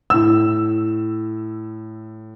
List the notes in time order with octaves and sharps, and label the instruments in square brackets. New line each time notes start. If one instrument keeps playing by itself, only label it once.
[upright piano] A2 E6